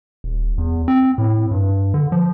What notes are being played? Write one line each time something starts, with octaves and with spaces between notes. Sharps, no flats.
D#1
E2
C4
A2
G2
D3
F3